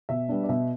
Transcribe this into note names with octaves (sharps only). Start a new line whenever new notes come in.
B2 E5
G3 B3 D4
D5
B2 E5